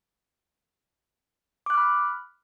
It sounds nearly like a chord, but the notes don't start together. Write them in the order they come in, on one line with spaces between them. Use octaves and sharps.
D6 F#6 F6 B5